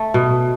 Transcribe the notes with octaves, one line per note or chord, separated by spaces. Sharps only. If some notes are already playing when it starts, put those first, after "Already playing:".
Already playing: A3
B2